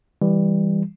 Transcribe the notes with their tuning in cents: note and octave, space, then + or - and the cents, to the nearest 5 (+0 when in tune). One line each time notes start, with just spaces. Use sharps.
E3 +0 G3 +15